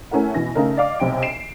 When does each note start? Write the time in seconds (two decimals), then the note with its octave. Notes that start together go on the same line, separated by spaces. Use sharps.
0.11 A3 C#4 E4 A#4 F#5
0.34 B2 E3 A#6
0.55 C#3 A3 D#4 A#4
0.77 D5 D#5 F5 D6
1.00 B1 C3 G5 D7
1.22 C7 D7 E7